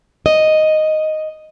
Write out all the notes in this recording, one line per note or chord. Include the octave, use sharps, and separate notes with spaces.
D#5